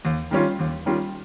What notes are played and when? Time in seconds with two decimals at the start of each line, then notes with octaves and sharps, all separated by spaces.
0.05 D#2
0.31 D#3 G3 C#4 F4
0.59 D#2
0.86 D#3 G3 C#4 F4